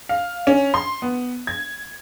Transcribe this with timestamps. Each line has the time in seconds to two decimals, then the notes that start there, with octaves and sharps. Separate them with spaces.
0.09 F5
0.47 C#4
0.74 C6
1.02 B3
1.47 G#6